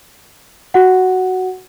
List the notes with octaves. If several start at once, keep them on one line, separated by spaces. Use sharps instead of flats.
F#4 F#5